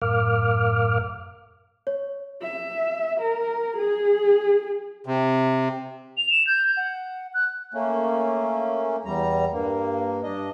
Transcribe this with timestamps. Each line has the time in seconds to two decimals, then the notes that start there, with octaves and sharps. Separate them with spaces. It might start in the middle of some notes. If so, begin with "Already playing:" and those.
0.02 F#2 A2 A#4 F5 D6 F6
1.87 C#5
2.43 E5
3.20 A#4
3.77 G#4
5.06 C3
6.17 F7
6.30 E7
6.47 G6
6.77 F#5
7.34 F#6
7.74 A3 A#3 C#4
9.05 E2 G3 A#5
9.52 G2 A#3
10.23 G2 D4 D#5